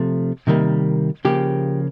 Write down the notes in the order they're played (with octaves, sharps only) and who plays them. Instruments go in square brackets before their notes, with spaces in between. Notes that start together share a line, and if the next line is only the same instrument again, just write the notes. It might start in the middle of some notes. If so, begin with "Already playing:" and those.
Already playing: [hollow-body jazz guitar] C3 F3 A3
C3 D#3 G3 A#3
C#3 F3 A#3 G4